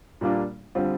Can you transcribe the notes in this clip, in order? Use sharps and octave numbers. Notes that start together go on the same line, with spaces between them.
A#2 G3 A#3 D4 F4
D3 G3 C4 F4